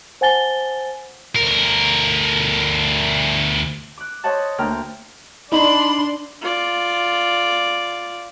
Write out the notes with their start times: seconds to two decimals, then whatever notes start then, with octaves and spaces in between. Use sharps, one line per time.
0.21 C5 F#5 G#5 A5 A6 G7
1.36 D2 A#4
3.98 D6 F#6
4.24 C5 C#5 D#5 F#5 A5
4.58 D2 A#3 G5 A#5 F6
5.52 D4 D#4 D#5 B5 C6
6.41 F4 D5